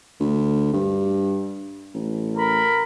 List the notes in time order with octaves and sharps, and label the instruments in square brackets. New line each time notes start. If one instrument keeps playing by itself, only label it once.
[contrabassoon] D2
G2
A1
[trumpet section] A#4 B5